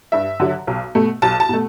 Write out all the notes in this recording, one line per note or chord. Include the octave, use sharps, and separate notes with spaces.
G2 E5
D3 F#3
B1
B2 A3
B1 A5
A5
B2 A3